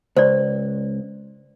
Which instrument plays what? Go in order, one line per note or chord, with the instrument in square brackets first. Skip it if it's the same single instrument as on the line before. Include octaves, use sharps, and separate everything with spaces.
[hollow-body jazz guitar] C#2 [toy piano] C5 D5